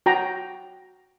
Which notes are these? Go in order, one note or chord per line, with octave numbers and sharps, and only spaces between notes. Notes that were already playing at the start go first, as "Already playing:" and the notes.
F#4 G5 A#5